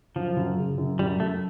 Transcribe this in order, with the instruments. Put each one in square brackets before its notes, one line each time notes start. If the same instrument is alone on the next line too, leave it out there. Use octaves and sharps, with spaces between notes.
[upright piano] F#2 [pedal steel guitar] F3
[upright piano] F#2
C#3
F#2
[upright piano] F#2 [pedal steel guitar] G3
[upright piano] F#2 [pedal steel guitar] A3